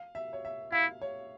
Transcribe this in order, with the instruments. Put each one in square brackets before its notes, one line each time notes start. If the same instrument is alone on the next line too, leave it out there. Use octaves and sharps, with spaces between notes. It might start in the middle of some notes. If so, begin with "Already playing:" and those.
Already playing: [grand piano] F5
E5
C#5
E5
[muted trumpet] E4 [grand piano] F5
[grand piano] C#5